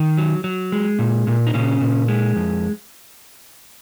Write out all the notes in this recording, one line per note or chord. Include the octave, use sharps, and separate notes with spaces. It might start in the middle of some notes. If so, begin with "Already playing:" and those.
Already playing: D#3
F#3
F#3
G#3
A#2
A#2
D#4
A#2 C#3 C#4
A#2
G#3
F2